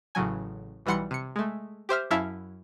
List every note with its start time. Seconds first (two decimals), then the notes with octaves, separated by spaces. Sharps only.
0.15 A1 A2 C#3 F#3 G#5
0.86 B1 E3 G3 F#5 C6 C#7
1.11 C3 C#7
1.36 G#3 A3
1.89 G4 C5 E5 F6
2.10 F#2 C#4 E4 E5 F5 A5